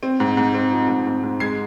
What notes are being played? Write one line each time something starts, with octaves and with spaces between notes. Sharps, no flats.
C4
G#2
G#2
C4
F3
G#2
G#2
G#2
G#3 G#6 C7